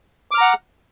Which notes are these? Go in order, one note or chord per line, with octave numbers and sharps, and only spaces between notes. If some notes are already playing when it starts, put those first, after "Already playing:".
F#5 A#5 D6 F6